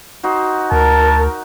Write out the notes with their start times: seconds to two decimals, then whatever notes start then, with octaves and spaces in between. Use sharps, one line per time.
0.23 D#4 F#4 C5
0.72 D2 A#4 A5